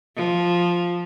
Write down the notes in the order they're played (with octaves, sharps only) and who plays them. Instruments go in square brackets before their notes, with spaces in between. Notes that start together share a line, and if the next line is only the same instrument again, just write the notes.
[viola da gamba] F3